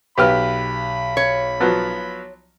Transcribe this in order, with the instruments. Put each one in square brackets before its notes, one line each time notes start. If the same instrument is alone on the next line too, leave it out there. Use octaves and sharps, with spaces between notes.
[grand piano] B1 [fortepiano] G4 B4 F6 [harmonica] B5
[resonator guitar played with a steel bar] C#5
[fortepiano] F3 F#3 B3